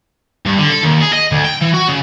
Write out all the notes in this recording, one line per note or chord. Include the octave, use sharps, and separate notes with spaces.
G2
D3
A4
D#2
G#4
D#5
D2
G5
E3
F#4
C#3